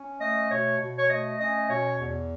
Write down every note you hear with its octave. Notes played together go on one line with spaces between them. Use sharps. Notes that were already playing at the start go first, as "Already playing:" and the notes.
Already playing: C#4
A3 D#5
B2 C#5
B2
C#5
A3 D#5
C#4 D#5
B2 C#5
E2